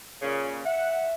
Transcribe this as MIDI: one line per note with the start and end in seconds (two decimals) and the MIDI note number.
0.22 0.61 46
0.22 0.61 49
0.65 1.14 76
0.65 1.09 78